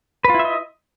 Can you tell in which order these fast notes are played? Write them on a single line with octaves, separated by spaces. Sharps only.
B4 F4 E4 E5 D#5